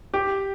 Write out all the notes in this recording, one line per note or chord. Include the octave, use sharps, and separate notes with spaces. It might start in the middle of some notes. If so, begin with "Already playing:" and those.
G4